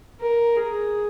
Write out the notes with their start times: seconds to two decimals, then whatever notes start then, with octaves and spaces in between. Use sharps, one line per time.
0.21 A#4
0.56 G#4